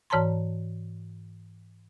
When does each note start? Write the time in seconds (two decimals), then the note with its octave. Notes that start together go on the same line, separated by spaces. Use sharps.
0.10 G#2 E3 C#5 A5 A#5 C6